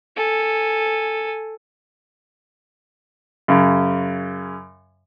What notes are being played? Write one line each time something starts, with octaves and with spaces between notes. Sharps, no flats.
A4 G#5
F#2 C#3